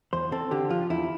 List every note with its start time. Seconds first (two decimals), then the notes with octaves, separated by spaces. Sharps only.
0.13 E2 C5
0.32 C4 A4
0.51 D3 G4
0.70 F3 F4
0.90 E2 E4